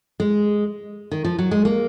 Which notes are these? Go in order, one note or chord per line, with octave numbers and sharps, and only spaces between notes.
G#3
D#3
F3
F#3
G#3
A#3